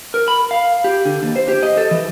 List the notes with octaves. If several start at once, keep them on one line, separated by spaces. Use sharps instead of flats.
A#4
B5
F5
G4
D3
D#2
C5
G4
D#5
A4
E3